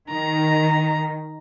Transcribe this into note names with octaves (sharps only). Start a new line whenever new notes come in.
D#3 A#5